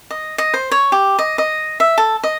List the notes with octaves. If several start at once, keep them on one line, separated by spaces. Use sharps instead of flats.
D#5
D#5
C5
C#5
G4
D#5
D#5
E5
A4
D#5